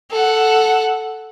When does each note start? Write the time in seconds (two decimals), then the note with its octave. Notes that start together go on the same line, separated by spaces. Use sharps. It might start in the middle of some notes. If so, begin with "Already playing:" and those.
0.11 A4 F#5